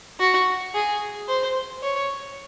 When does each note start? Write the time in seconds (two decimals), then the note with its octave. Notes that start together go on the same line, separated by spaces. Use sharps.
0.20 F#4
0.74 G#4
1.28 C5
1.83 C#5